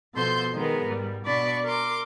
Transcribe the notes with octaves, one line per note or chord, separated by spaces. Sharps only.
B2 F3 A4 C5 C6 G6
D#3 G#3 B3 A#4
G#2 G3
B2 D4 D5 B5 C#6
A#4 C6 D6